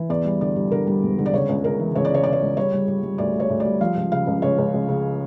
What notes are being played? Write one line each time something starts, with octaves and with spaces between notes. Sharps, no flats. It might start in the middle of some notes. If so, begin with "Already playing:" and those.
Already playing: E3
E2 D5
G3
D3 D5
G3
D3 A#4
G3
E1
D3
D5
C#3 C#5
C#2
C#2 A#4
E3
C#2 C#5
D5
C#3 C#5
C#3 D5
C#5
C#2
G3 C#5
G3
G3
G3
D2 D5
D2
C#5
D2
G3 D5
F3 F5
C#2
C#3 F5
C#2
C#2 C#5
C#2
C#2
C#3